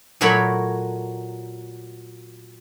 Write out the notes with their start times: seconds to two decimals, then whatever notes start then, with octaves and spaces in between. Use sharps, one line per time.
0.21 A#2 F#3 A3 A#4 C#5 B5